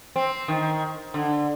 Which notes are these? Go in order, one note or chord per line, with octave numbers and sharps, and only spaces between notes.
C4
D#3
D3